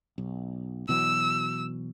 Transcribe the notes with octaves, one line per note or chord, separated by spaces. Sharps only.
B1
B2 E3 F#3 E6